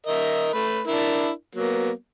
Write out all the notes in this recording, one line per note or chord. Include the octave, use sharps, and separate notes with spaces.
A#4 D#5 E5
A3 B4
D4 E4 A#4
F#3 A#3 B3